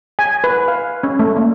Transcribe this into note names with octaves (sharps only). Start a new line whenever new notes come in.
G#5
B4
F5
C#4
A3
A#3